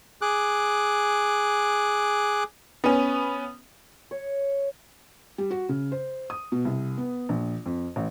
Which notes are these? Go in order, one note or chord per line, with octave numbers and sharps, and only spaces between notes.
G#4 D6 F#6
B3 C#4
C#5
G3
F#4
C#3
C5
D#6
B2
C2
B3
A#1
F2
A1